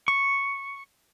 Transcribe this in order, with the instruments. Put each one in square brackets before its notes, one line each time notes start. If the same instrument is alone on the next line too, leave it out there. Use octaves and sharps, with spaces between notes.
[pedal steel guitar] C#6